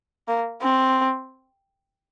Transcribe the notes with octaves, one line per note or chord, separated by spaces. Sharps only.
A#3
C4